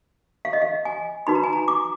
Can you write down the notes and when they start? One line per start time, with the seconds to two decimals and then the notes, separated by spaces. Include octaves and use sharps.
0.45 F5
0.53 D#5
0.62 F5
0.85 G#5
1.27 D#4 F#4 B4 B5
1.35 A#5
1.43 G#5
1.53 A#5
1.68 D6